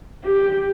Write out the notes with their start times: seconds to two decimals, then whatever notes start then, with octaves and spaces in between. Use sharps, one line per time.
0.24 G4